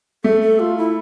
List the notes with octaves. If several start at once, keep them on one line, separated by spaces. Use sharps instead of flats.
A3 A4
A4
F4
E4